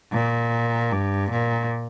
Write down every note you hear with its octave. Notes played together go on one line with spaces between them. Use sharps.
A#2
G2
A#2